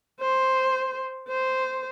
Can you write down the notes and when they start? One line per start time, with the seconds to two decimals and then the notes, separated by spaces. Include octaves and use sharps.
0.21 C5
1.28 C5